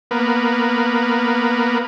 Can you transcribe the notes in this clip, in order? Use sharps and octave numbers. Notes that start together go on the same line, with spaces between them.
A#3 B3